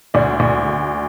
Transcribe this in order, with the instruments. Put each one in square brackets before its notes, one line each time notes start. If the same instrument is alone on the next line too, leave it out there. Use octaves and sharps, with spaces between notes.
[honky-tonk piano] D2 D5
D2